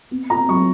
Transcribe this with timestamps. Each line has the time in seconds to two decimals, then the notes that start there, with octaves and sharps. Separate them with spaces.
0.11 B3
0.30 F4 A#5
0.49 F#3 C#6